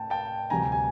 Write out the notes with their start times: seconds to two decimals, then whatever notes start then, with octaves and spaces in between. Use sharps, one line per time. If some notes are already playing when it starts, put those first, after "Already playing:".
Already playing: A2 G5 A5
0.10 G5 A5
0.50 D2 C3 E3 G3 G#5 A#5
0.72 G#5